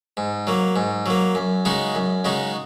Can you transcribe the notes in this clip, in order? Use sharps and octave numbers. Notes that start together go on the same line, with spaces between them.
G#2
F#3 A#3
G#2
F#3 A#3
F#2
C#3 G#3 D#4 F#4
F#2
C#3 G#3 D#4 F#4